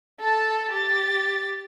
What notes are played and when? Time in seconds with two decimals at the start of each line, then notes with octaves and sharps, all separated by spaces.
0.20 A4 A5
0.72 G4 A6